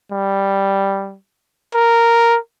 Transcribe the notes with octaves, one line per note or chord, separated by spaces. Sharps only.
G3
A#4